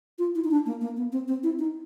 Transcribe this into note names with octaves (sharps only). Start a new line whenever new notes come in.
F4
E4
D#4
D4
A#3
A#3
B3
C4
C4
E4
D#4